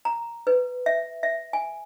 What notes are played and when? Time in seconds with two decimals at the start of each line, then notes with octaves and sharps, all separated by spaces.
0.05 A#5
0.47 B4
0.86 E5
1.23 E5
1.53 G#5